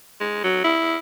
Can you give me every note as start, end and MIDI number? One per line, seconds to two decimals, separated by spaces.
0.21 0.41 56
0.44 0.61 54
0.64 0.97 64